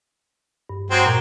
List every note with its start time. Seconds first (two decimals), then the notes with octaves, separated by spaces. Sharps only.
0.70 G2
0.91 F#3 G#3 C4
1.06 A#2 A#5